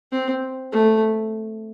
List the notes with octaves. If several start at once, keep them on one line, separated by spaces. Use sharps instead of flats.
C4
A3